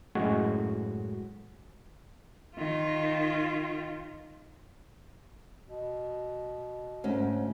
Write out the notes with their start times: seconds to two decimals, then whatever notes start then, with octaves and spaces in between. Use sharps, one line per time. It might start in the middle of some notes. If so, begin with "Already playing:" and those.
0.15 F#2 A2 G#3 F#4
2.56 D#3 F4
5.66 B2
7.04 D2 G#2 C#4